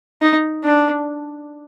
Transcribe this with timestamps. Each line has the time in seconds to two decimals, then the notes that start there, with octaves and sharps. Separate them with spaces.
0.22 D#4
0.64 D4